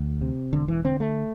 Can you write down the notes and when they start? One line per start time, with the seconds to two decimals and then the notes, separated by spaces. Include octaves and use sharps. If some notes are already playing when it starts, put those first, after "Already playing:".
Already playing: D2
0.21 C3
0.53 E1 D3
0.68 E3
0.84 D3 C4
1.00 A3